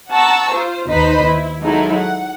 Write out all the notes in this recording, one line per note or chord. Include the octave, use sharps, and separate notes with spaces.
F#5 A5 A#5 C#6 E6
F4 C5
D#2 D#4 B4 C5 D#5 B5
E4
F#3 G#3 D#4 E4 A4 A#4
F#5